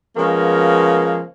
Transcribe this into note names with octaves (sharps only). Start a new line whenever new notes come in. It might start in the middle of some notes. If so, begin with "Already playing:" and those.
C#3 F3 G#3 A#3 B3